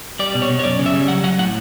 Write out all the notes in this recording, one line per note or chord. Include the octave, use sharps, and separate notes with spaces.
G3 D5
B2
C#5
B2
C#5
F#2 D5
C#3
E5
G3
F#3 F#5
F#3 F#5
A2 F#5